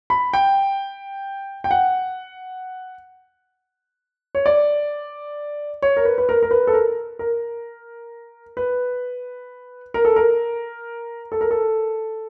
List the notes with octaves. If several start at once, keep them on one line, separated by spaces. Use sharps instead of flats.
B5
G5
G5
F#5
C#5
D5
C#5
A#4
B4
B4
A#4
A#4
B4
A4
A#4
A#4
B4
A#4
A4
A#4
A4
A#4
A4